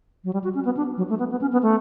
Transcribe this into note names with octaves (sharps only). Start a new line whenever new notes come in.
F#3
G3
F#4
C#4
B3
D4
F#3
A3
B3
B3
C#4
B3
A3